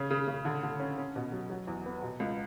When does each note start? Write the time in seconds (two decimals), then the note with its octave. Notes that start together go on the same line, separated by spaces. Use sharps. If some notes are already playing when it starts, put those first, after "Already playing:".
Already playing: C#3 C#4
0.10 C#3
0.28 C#3
0.45 D3
0.63 D3
0.80 C#4
0.98 C#4
1.16 B2
1.32 F#3
1.50 F#3
1.67 E2
1.86 B3
2.02 B2
2.20 C#2